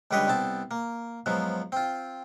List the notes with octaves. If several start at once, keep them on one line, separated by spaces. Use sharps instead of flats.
C#2 D3 G3 B4 C#5 D#5
C2 B3 C4 A5
A#3
G#2 F3 F#3 B3
C4 F4